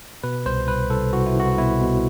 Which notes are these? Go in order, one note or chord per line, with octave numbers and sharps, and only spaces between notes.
B2 B4
C2 C5
C2 B4
C2 A4
C2 F#4
E4
C2 F#4
B2 E4
B2